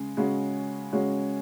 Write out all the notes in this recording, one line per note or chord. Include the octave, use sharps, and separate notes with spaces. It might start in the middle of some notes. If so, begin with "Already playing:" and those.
Already playing: C#3 G#3
C#3 G#3 C#4 F#4
C#3 G#3 C#4 F#4